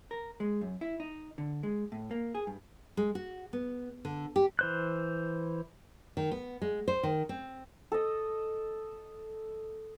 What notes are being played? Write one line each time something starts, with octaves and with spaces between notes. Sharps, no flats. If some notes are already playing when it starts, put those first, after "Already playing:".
A#4
G#3
F#2
E4
D#4
D3
G#3
A2
A#3
G#4
G2
G#3
F#4
B3
D3
G4
E3 C5 F#6
D#3
B3
G#3
C5
D#3
C4
A4 D#5